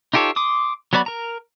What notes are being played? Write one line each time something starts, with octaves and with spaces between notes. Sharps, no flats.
D#4 F4 G4 A4 C#5
C6 D6 D#6
F#3 B3 F#4 D5 B5
A#4 A#5